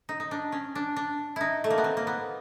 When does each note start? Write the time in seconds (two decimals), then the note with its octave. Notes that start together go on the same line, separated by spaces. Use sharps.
0.09 D#4
0.20 D#4
0.31 D4
0.52 C#4
0.75 D4
0.96 D4
1.36 D#4 E4
1.64 A3
1.70 A#3
1.78 B3
1.84 C4
1.97 A#3
2.07 B3